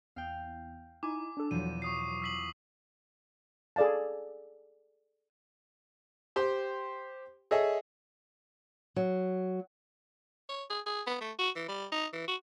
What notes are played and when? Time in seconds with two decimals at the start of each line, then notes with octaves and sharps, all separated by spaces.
0.16 E2 F5 G5
1.03 D#4 E4 G#5 D6
1.37 D4 A4
1.51 E2 B2 F3 F#3 D#7
1.82 C#6 D#6 C7
2.22 E6 B6 F#7
3.76 G#4 A4 D5 F5 A5
6.36 G4 C5 G5 C6
7.51 G#4 A4 C#5 D#5 E5
8.96 F#3
10.49 C#5
10.70 G#4
10.86 G#4
11.07 B3
11.21 A3
11.39 F#4
11.56 E3
11.68 G3
11.92 D#4
12.13 E3
12.28 F#4